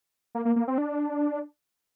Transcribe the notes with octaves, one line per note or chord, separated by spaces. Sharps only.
A#3
A#3
A#3
C4
D4